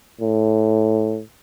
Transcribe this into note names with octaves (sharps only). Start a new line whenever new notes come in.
A2